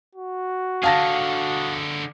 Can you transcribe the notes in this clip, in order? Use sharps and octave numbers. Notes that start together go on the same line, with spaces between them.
F#4
D3 G#4 F5 A5 A#6